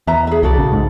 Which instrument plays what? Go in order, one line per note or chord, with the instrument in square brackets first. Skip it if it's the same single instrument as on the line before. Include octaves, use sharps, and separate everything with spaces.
[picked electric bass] E2 [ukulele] B4 E5 A#5
[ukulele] G#4 E5
[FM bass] C2 [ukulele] F#4 A4 D5
[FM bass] A#1 [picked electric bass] C#3
[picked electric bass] G#2